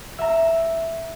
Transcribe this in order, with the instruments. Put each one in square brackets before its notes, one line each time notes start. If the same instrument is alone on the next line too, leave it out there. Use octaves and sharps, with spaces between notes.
[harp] E5 A#5